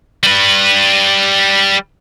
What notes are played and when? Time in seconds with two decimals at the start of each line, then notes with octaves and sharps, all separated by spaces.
0.23 G3 B4